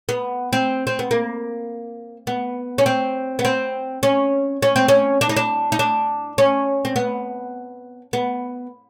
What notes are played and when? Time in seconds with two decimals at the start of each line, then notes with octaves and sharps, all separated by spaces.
0.09 B3
0.53 C4
0.87 C4
0.99 B3
1.11 A#3
2.27 B3
2.78 C#4
2.86 C4
3.39 B3
3.45 C4
4.03 C#4
4.62 C#4
4.76 C4
4.88 C#4
5.21 D4
5.29 D#4
5.37 D4
5.72 D#4
5.79 D4
6.38 C#4
6.85 C4
6.96 B3
8.13 B3